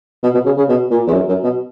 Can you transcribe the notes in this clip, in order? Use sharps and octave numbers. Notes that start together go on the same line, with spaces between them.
B2
B2
C#3
C#3
B2
A#2
E2
F#2
F#2
B2